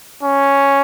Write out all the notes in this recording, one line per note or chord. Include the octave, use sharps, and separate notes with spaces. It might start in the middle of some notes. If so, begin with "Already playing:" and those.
C#4